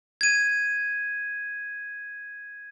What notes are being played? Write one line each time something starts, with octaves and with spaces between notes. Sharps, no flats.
G#6 D#7